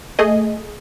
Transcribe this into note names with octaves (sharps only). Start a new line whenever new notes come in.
A3 G#4 D#5